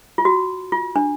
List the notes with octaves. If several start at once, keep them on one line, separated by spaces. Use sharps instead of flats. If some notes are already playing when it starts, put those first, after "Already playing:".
F4
F#4
F4
D4